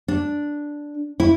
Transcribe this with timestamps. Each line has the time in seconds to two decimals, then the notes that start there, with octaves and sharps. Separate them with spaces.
0.08 D4
1.20 E4